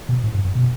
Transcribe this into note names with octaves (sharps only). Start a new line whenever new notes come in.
B2
A2
G2
F#2
B2